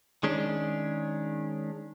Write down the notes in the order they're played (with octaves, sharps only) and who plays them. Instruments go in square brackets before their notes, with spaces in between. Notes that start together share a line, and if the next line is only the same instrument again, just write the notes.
[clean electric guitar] D#3 G#3 C#4 D4